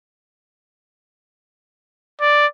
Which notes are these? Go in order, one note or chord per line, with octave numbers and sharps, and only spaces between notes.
D5